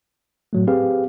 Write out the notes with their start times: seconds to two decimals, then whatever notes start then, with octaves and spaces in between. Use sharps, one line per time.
0.53 A2 F#3 A3
0.67 C4 G4 G#4 B4 F5